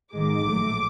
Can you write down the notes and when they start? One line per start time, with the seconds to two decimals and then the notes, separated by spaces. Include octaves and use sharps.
0.12 G#1 G#2 D#3 G#3 D6
0.43 A#1 A2 F#3 A3